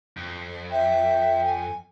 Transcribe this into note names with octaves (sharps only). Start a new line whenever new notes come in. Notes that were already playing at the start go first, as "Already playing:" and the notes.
F2
E5 G5
G#5